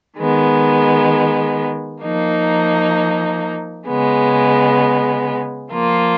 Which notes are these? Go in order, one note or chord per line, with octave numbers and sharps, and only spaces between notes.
D#3 G#3 B3
F3 A#3 D#4
C#3 G#3 B3
F3 A#3 F4